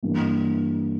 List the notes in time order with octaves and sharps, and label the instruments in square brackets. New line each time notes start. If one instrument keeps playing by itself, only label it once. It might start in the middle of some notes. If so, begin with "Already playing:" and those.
[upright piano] G2 E3 A#3